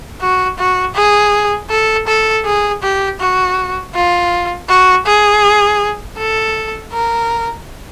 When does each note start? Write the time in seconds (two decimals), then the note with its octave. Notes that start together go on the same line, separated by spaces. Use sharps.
0.21 F#4
0.58 F#4
0.95 G#4
1.70 A4
2.07 A4
2.45 G#4
2.83 G4
3.20 F#4
3.95 F4
4.69 F#4
5.06 G#4
6.18 A4
6.93 A#4